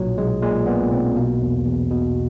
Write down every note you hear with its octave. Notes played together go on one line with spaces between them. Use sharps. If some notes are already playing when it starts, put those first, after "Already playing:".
Already playing: B1 A#2 F#3
B1 G#3
A#2 G#3
A#2 B3
B1 C4
B2 A#3
E2
E2
B2